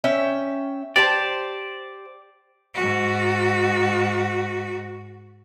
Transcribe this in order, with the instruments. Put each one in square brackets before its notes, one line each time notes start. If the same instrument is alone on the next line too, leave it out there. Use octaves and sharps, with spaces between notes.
[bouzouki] C#4 E5 G5
[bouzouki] G4 C5 A5 [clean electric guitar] D5
[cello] G#2 F#4